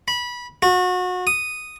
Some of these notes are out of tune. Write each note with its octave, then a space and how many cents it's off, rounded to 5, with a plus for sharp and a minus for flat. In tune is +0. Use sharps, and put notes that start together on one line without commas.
B5 -20
F#4 -30
D#6 -5